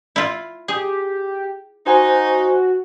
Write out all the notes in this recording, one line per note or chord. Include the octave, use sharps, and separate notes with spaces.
E4 F4
G4 G#4
D#4 F#4 C5 G#5